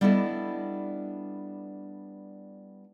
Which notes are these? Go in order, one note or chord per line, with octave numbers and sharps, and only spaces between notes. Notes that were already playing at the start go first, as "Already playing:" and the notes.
G3 B3 D4 E4 A4 D#5